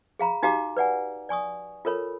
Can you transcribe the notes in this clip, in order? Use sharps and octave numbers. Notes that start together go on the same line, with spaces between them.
G#4 F5 A#5 B5
D#4 F#4 G4 F5 A#5 D6
B4 D5 F#5 G#5
D5 G#5 C#6 D#6
F4 A4 A#4 C#5 B5